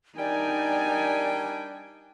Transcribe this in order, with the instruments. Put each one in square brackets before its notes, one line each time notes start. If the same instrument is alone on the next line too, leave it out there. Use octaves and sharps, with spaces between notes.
[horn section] G3 D4 G5 [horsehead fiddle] D#4 G#5 [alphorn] A#4 [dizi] D5